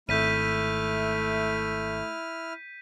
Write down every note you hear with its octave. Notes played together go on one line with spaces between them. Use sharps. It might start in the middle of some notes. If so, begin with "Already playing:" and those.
G#1 A3 E4 F6 G6 B6 D#7